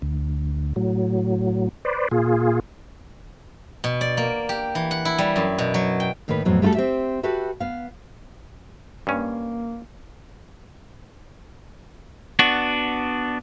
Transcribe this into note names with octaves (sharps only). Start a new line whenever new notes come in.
D2
A2 F#3
B4 C5 D5
A#2 F4 G#4
B2
D5
A#3
G4
E3
F#5
E4
G3
F#2
B2
F#3
G5
A2 D#3 A#3 D#4 B4
F2 A2 F#3 B3
G3 A3 F4 F#4 A4
C4 G4 E5
F#4 G4 A4 B4 E5
B3 F5
G2 A#3 C#4
B3 D4 F#4